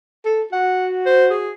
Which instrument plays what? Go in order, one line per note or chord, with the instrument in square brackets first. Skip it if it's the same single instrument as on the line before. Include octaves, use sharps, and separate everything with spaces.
[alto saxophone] A4
[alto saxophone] F#4 [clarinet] F#5
[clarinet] C5
G#4